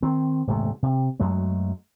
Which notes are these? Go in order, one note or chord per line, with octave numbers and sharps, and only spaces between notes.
D#3 C4
D#1 G#2 C3 A3
C3
F#2 F#3 G#3 A3